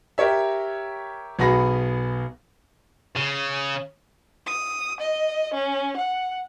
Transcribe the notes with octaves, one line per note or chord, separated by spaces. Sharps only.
G4 A#4 C#5 E5
B1 B3 F#4 G#4 B5 A#6
C#3
D#6
D#5
C#4
F#5